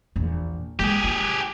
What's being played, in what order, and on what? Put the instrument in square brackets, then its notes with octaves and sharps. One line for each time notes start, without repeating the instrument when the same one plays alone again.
[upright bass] A#1 E2
[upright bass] G#3 A#3 [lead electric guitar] G4 G#4
[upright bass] F4